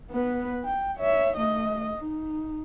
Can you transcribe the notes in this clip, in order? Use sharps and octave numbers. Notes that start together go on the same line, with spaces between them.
B3 B4
G5
C#5 E5
A3 D#5
D#4